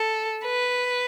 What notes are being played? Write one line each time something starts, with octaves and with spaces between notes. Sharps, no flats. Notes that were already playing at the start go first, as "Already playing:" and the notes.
Already playing: A4
B4